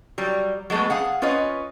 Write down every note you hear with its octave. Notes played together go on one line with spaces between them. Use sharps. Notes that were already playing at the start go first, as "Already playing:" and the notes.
F#3 G3
F#3 G#3 A3 B3 B4
G#4 F5 F#5
C#4 F4 B4 C#5 D#5